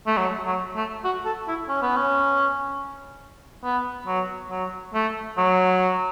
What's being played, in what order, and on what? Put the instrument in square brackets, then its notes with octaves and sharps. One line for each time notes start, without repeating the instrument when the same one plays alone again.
[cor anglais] A3
F#3
F#3
A3
F#4
A4
E4
C#4
B3
C#4
B3
F#3
F#3
A3
F#3